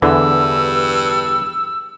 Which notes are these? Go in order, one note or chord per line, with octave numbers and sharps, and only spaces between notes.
E2 G2 D3 E3 E6